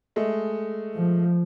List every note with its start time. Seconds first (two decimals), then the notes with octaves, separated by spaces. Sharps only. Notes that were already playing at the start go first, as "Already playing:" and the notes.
0.16 G#3 A3
0.95 F3